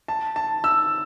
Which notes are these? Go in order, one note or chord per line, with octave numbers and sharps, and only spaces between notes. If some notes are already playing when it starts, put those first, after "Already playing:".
A5
A5
E6